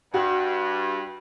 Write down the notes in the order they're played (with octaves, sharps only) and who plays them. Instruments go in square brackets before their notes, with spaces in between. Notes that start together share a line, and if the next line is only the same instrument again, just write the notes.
[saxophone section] G2 [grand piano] F#4